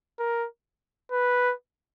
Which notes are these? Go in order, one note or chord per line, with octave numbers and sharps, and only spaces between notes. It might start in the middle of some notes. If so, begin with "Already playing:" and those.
A#4
B4